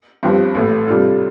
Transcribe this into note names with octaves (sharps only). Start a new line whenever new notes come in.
G1 G2 F3 C4 G4
A1 A2 A3
C3 G3 D4 F4 A4